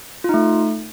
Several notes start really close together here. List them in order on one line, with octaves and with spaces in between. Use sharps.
F4 D#4 A3